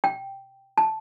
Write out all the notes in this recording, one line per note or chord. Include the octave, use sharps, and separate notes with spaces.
G5
A5